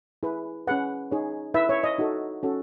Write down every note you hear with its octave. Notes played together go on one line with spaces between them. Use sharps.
E4 G#4 B4
C#4 G#4 B4 F#5
D#4 G#4 C#5
E4 B4 E5
C#5
D#5
D#4 F#4 A4
C#4 F#4 A4